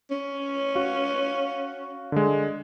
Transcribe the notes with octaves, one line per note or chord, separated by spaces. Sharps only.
C#4
F#4 F5
D3 G#3